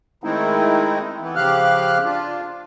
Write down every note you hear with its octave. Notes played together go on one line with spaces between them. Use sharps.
D#3 G#3 A3 C4 D#4 E4
E3 B3
C#3 F3 G4 F5 F6 F#6
D4 F4